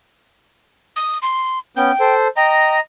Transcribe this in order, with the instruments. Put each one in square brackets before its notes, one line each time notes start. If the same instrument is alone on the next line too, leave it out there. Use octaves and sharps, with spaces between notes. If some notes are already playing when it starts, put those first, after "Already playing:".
[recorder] D#6
C6
[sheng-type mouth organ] B3 C#4 G6 [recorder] G5
[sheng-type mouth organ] A4 C5
[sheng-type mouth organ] D#5 A#5 [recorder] G5